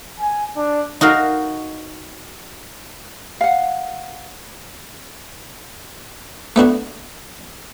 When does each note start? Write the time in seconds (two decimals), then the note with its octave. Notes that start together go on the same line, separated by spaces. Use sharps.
0.20 G#5
0.56 D4
1.01 D#4 F#4 A#4 F5
3.41 F5 F#5
6.56 A3 B3 D4 F#4